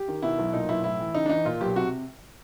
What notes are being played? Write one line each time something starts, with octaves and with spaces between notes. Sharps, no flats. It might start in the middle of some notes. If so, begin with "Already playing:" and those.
Already playing: G4
D#3
B2 E4
B1
A#2 D#4
B1 E4
A2 E4
E3
C#3 D#4
D4
E3 D#4
A#2 F4
B1 G4
C3 F#4